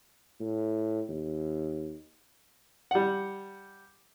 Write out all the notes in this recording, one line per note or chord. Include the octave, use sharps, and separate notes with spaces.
A2
D#2
G3 F#5